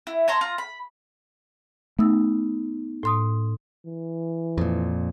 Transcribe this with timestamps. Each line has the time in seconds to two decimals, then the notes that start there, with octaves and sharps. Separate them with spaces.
0.07 E4
0.28 C#5 A5 A#5 C6
0.41 F4 A#5
0.58 B5
1.99 A3 B3 D#4 E6
3.03 A2 C6 D#6
3.86 E3
4.58 F2 A#2